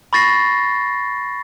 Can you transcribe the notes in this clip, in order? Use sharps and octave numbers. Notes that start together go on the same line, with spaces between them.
B5 C#6 A6 A#6 C7